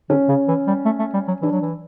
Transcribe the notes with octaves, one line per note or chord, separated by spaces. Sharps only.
D3 C#4
C#3
E3
G3
A3
A3
G3
F#3
E3 D4
F#3
E3